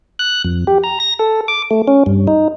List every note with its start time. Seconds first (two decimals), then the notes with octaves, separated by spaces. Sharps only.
0.19 F#6
0.45 F2
0.67 G4
0.84 A#5
1.00 A#6
1.19 A4
1.48 D6
1.71 A3
1.88 C#4
2.06 G2
2.27 D#4